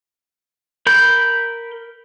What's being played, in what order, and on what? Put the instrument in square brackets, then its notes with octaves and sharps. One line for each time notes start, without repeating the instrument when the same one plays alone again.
[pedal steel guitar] A#4 B5 G6